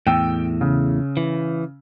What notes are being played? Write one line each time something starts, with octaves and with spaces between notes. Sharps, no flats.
E2 A2 G5 E6
C#3
E3